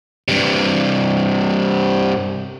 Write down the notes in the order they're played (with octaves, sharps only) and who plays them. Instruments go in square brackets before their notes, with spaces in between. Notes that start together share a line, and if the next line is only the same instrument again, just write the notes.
[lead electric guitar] G2 C3